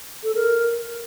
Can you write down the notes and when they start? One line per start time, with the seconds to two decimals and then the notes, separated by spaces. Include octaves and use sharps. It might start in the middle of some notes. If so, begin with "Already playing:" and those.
0.24 A4
0.35 A#4